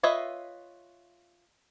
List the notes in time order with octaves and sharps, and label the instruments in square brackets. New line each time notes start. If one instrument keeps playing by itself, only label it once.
[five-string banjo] F4 B4 C#5 D#5 E5